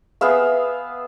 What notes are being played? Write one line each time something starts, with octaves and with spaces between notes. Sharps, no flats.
B3 G#4 E5 F5